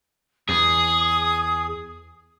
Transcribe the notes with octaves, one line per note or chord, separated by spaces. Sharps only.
E2 G#4 D#6